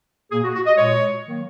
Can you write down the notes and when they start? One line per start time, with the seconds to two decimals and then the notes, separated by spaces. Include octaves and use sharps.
0.31 A#2 A#3 G#4
0.43 F#4
0.55 F#4
0.66 D#5
0.77 A#2 G#3 C#5
1.26 D#3 F#3 A#3